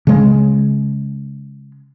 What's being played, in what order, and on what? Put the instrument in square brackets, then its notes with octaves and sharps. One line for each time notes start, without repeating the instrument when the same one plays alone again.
[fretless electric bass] C#3 G#3